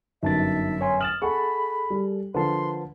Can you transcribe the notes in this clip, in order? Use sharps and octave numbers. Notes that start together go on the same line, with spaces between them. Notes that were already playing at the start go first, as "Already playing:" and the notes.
G1 F#2 D#4 E5 A5 A6
C#5 G#5 C6
D#6 F6 A6 E7 F#7
G#4 A4 F#5 B5 C#6
G3
D3 F3 A#4 B4 A5 C6